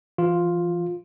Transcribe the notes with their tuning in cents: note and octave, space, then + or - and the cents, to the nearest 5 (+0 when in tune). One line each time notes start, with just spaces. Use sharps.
E3 +40 F4 +5